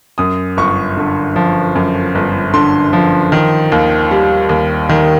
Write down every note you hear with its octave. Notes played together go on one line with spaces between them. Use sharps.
F#2 D#6
G1 C#6
D3
F3
F#2
G1
D3 C6
F3
D#3
D#2
G3
D#2
D#3